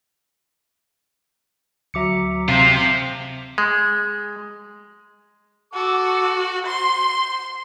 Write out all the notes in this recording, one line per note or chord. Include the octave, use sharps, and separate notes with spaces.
D2 F#3 E5 A#5 D6 C#7
C3 F4 C5 F5 B6 C7
G#3
F#4 A4 A5 D6
C5 C6